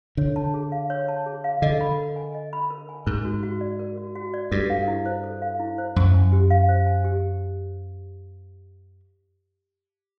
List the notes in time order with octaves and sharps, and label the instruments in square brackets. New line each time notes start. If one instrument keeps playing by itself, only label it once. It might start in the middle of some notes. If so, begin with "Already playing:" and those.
[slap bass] D3 [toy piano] C#5
[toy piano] A5
G#4
F5
C#5
A5
G#4
F5
[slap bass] D3 [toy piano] D#5
[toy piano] B5
A#4
G#5
D#5
B5
A#4
G#5
[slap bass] G#2 [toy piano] A#4
[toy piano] F#4
F#4
D5
A#4
F#4
F#4
D5
[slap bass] G2 [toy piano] A4
[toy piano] F5
E4
C5
A4
F5
E4
C5
[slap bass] F#2 [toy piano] C5
[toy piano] G#5
G4
F5
C5
G#5
G4